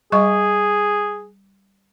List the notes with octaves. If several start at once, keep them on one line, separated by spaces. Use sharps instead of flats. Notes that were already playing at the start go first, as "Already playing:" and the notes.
G3 G#4 D#5 C#6